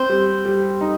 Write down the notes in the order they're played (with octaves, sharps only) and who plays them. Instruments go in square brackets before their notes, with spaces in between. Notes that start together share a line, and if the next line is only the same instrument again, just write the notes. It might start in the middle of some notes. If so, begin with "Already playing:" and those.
Already playing: [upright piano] C4 [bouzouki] C5
[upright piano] G3
G3
D#4